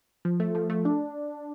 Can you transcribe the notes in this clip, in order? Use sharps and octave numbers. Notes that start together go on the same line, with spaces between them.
F3
A3
F3
A3
D4